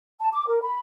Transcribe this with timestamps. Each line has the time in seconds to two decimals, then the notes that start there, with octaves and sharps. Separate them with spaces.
0.19 A5
0.32 D6
0.47 A#4
0.62 B5